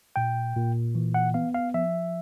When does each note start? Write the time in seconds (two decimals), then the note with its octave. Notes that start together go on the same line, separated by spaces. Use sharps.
0.16 A#2 G5
0.56 A#2
0.95 E3
1.14 F#5
1.34 B3 F5
1.54 F5
1.74 F3 E5